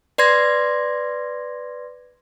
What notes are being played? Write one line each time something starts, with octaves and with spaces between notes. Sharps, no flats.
B4 D5 C6 G#6 A#6